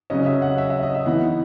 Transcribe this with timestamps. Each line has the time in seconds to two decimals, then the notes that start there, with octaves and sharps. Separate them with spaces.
0.10 C#3 F#3 C#4 D#5
0.26 E5
0.42 F#5
0.58 E5
0.70 E5
0.83 D#5
0.95 E5
1.06 E3 B3 D#4 F#5